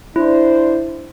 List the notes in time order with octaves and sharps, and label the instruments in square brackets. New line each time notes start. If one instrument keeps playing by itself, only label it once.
[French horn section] D4 C5 [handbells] E4